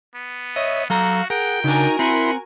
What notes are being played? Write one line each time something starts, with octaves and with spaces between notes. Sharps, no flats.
B3
C#5 D#5 E5
F#3 F#4 A4 F5 A#5
G#4 A#4 F#5 G5
C#3 D4 D#4 F#4 A#4 G#5
C4 E4 F#5 B5 C6